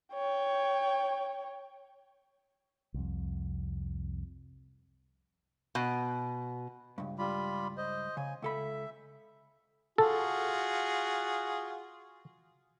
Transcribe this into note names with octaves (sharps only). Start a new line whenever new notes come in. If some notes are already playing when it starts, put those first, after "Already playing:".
C#5 G5
C2 F2
B2
C#2 G2
G3 F4 B5
C5 D#5
C#3 G#5
C#2 A4 E5 B5
F4 F#4 G#4 A4